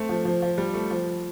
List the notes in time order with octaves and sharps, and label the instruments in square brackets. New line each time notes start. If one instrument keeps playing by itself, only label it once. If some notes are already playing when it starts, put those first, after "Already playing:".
Already playing: [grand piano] A3 C4
F3
F3
F3
G3
A3
F3